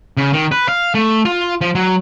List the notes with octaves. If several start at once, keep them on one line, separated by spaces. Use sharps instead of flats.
C#3
D#3
B4
F5
A3
F4
F3
F#3